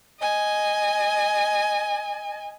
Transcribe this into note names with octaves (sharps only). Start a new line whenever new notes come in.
D#5 G#5